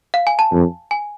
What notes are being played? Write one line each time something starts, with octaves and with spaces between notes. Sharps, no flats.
F5
G#5
A5
F2
G#5